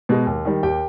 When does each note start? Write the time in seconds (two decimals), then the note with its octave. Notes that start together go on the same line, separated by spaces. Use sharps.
0.09 B2 G#3
0.27 D#2
0.45 D#3 G3
0.63 D#2 G4 G5